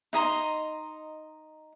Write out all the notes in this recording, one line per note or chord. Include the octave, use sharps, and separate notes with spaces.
D#4 D#5 A#5 C6